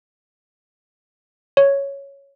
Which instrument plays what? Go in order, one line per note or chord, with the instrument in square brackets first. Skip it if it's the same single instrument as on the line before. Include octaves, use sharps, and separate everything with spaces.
[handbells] C#5